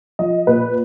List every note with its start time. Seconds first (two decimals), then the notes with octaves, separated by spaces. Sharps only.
0.19 F3 D#5
0.47 A#2 B4